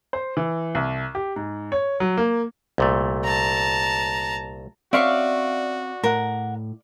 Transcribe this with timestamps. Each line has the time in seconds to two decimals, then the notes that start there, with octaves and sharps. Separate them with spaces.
0.13 C5
0.37 E3
0.75 C2
1.15 G4
1.36 G#2
1.72 C#5
2.00 F#3
2.17 A#3
2.78 C2 A#2 A3
3.24 A5 A#5
4.93 C4 C#4 F#4 C#5 D5 E5 F5 C#6
6.04 A2 A#4 F#5